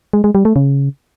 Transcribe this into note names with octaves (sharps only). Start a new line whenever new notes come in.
G#3
G#3
G3
A3
C#3